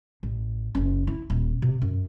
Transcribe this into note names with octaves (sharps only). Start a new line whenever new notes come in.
A1
F#1 C#4
E4
D#1
C3
F#2